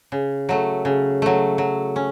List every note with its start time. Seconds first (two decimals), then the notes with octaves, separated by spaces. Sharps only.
0.12 C#3
0.49 F#3 A3
0.85 C#3
1.22 F#3 A3
1.58 F#3
1.96 C#4